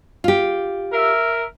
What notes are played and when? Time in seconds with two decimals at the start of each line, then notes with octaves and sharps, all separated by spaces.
0.24 F4 G4
0.92 A#4 E5